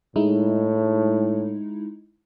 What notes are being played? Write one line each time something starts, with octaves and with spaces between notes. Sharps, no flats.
A2 G#3 D#4 E4